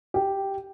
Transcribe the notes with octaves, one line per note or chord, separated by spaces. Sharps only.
G4